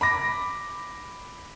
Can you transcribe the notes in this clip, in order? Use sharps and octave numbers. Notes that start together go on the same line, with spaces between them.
B5 D6 A#6